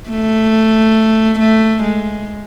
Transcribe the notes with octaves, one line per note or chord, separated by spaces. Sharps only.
A3
A3
G#3